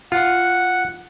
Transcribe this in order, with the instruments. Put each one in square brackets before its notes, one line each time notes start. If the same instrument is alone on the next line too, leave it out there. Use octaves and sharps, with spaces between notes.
[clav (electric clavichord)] F4 [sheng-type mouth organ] F#5